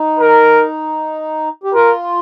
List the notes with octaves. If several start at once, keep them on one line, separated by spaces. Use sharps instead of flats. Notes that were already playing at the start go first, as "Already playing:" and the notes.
Already playing: D#4
A#4
G4
F4 A#4